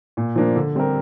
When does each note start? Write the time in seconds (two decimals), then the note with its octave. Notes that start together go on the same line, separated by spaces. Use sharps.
0.17 A#2
0.36 F3 A#3 D4
0.56 D3
0.75 G3 C4 G4 A#4